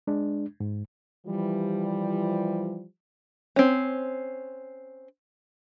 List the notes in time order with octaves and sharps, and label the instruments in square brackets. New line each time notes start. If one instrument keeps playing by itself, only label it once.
[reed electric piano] G#3 D4
G#2
[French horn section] E3 F3 G3
[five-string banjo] C4 C#4